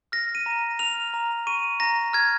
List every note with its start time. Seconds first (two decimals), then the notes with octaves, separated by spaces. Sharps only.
0.12 F6 A#6
0.35 D#7
0.46 A#5
0.79 F6 F7
1.14 A#5
1.47 C#6 D#7
1.80 A#5 A#6
2.13 F6 G#6